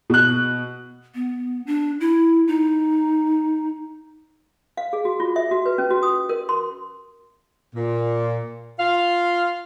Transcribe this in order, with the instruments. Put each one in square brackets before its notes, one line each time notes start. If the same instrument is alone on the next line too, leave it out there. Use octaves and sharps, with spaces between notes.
[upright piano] B2 F#6
[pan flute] B3
D4
E4
D#4
[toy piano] F5
G#4
F#4
F4
E5
F#4
B4
C#4
F#4
D#6
A#4
C6
[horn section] A#2
F4 F5